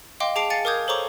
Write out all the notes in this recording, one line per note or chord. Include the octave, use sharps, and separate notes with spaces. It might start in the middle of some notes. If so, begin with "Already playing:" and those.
D#5 F5 G5 C6 D6
G#4 A5 D6 C7 D7 F7
F5 G#5 A6 C#7
A#4 F5 D6 D#6 G6 G#6
A4 C5 C#5 A#5 C#6 D6